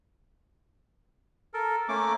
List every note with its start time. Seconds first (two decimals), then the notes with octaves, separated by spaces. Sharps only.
1.54 A4 A#4
1.89 A3 A#3 C#4 D6